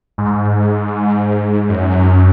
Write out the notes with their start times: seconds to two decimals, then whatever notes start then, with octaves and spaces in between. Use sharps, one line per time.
0.18 G#2
1.69 F#2